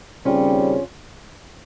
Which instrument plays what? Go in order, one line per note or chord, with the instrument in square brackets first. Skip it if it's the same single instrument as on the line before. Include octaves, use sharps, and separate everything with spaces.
[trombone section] D#2 C#3 G3 C4 [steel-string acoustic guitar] C#4 F4